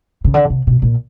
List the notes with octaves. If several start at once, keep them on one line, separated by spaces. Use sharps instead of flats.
C#3
D3
C3
B2
A#2